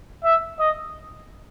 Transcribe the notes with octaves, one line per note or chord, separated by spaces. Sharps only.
E5
D#5